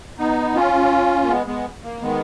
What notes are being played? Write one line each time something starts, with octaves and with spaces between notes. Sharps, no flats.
B3 D#4
C#4 F4
A#3
G#3 B3
G#3 B3
A#3
D#3 G#3 B3